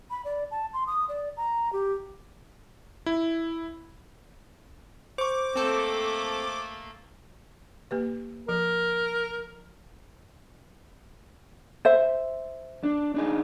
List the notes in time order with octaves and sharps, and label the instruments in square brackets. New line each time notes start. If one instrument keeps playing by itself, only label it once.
[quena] B5
D5
A5
C6
D#6
D5
A#5
G4
[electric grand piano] E4
[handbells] C5 C#6 [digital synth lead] D6
[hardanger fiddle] A3 A#3 [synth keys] C4 A4
[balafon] A#3 G4 B4
[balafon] F3 [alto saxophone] A#4
[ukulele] C5 E5
[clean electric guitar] D4
D4 D#4 G#4